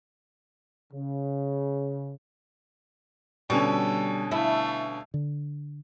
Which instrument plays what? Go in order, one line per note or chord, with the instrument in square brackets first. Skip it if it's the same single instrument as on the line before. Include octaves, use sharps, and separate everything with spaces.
[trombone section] C#3
[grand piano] B2 D3 C#4 [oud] G3 [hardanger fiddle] A4
[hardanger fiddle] A3 F5 [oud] E4
[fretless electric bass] D3